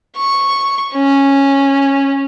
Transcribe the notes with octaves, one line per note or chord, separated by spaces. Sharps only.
C#6
C#4